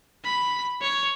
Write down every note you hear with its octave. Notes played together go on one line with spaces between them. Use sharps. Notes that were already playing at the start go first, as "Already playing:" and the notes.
B5
C#5